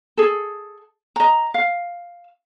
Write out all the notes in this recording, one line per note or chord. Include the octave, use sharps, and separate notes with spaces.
G#4 A4
D#5 A#5
F5